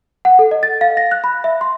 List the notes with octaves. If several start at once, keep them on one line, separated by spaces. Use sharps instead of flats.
F#5
A4
D#5
A6
F5
A#6
F#6
B5
E5
C6